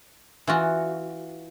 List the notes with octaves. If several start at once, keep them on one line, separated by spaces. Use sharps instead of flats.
E3 F4 F#4